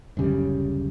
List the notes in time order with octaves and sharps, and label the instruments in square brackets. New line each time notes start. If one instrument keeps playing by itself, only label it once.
[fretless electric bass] D1 F#2 C#3 G3